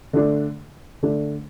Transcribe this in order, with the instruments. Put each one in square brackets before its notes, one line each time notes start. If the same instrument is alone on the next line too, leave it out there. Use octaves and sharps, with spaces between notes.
[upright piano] D3 A3 D4
D3 A3 D4